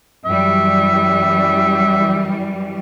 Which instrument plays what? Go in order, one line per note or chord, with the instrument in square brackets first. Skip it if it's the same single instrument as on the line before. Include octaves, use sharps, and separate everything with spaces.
[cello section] F#2 E3 G3 [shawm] E5